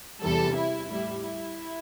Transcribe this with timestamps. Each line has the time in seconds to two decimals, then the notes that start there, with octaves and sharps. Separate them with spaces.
0.22 E2 C3 E3 G3 A4
0.55 E4
0.88 A2 G3 E4
1.21 E4